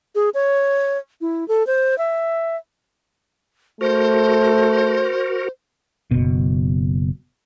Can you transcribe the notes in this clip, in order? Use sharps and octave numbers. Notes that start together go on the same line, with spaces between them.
G#4
C#5
E4
A4
C5
E5
A3 F#4 A#4 C5
F#1 B2